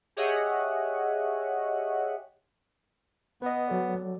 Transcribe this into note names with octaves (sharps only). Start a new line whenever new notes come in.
G4 G#4 C#5 D#5 E5 F#5
B3 B4 D#5
F#3 A4 D5